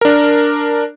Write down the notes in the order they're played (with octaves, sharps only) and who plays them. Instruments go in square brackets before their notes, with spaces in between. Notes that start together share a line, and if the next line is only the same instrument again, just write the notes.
[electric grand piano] D4 A#4